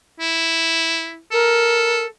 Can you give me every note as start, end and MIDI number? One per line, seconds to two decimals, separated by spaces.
0.20 1.20 64
1.31 2.06 69
1.31 2.04 70